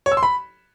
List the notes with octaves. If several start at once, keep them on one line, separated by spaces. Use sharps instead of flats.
C#5
E6
C6
B5